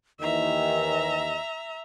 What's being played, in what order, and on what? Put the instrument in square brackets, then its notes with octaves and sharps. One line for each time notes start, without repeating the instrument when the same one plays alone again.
[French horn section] D#2 D#3 E3 [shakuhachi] D#5 [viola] E5 A#5